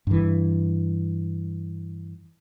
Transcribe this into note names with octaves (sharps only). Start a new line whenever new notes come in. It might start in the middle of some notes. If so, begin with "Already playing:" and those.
G2 E3